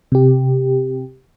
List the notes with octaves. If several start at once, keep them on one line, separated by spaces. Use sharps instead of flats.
C3 G4